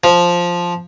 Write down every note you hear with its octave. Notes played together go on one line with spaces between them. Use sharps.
F3